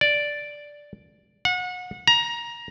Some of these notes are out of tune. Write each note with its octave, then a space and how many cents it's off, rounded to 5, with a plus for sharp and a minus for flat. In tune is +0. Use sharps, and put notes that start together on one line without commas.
D5 +0
F#5 -30
A#5 +20